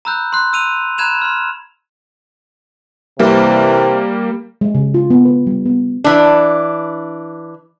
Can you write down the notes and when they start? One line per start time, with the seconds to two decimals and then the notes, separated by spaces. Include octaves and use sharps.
0.05 A#5 B5 E6 F#6 G6
0.33 C6 F#6
0.53 E6 D#7 F7
0.98 A#5 B5 F#6 G#6 E7 F7
1.22 C6 F6
3.19 C3 E3 G3 A#3
4.61 G#3
4.75 C#3
4.94 F4
5.10 B3
5.25 B4
5.47 G3
5.65 B3
6.04 E3 D4